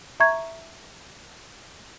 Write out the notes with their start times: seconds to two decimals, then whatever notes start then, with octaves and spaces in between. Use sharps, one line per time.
0.20 E5 A#5 C#6 G#6